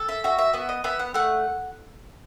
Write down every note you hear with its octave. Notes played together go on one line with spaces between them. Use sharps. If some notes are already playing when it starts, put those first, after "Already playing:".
Already playing: A4
E5
F#4 E5
E5
B3 E5
D#5
B3 E5
F#5
A3 F#5